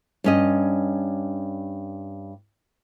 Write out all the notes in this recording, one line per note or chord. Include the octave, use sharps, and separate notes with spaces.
G2 C#4 D#5